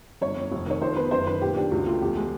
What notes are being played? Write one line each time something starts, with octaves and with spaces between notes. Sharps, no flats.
G1 C#5
G1
F1
D#3 C#5
F2 C5
B3 B4
F#1 C5
D#3 B4
A#2 G4
D4 G4
C#2 F#4
A3 F4
E2 G4
G#3